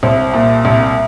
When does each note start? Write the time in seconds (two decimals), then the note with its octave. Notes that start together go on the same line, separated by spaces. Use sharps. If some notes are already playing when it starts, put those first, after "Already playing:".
0.03 C2 C5
0.34 A#2
0.65 C2